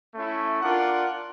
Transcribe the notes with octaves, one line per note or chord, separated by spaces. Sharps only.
A3 C#4 E4
D4 F4 A#4 D5 F#5